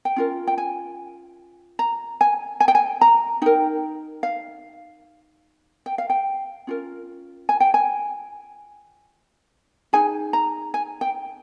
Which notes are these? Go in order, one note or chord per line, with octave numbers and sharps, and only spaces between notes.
G5
C#4 F4 A#4
G5
G#5
A#5
G#5
G#5
G5
G#5
A#5
D#4 A#4 G5
F5
G5
F5
G5
C#4 F4 A#4
G#5
G5
G#5
D#4 G#4 G#5
A#5
G#5
G5